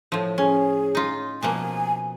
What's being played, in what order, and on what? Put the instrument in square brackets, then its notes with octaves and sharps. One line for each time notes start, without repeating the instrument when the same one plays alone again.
[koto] A2 F3
[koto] C#4 [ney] G#4
[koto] D#4 F4
[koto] B2 F3 A#3 [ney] G#5